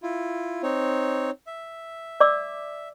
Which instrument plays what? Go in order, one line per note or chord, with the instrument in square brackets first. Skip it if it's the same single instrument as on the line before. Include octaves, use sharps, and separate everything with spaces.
[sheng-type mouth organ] E4 F4
C4 D#4 C#5
E5
[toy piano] D5 D6 E6